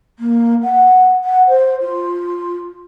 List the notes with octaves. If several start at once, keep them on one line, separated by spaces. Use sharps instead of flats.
A#3
F#5
F#5
C5
F4